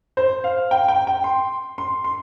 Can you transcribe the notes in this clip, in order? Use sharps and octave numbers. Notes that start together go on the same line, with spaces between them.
C5
F5
G5
G5
G5
C6
C6
C6